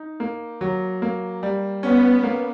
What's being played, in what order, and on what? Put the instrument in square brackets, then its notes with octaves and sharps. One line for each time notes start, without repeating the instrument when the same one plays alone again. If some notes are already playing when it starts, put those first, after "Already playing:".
Already playing: [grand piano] D#4
A#3
F#3
A#3
G3
[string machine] B3 [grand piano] C#4
[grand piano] A#3